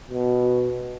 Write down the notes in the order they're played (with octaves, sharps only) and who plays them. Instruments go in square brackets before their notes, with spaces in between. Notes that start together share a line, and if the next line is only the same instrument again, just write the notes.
[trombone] B2